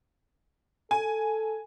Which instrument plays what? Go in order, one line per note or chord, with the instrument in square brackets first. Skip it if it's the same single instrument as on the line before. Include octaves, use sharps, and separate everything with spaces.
[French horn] A4 [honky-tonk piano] G#5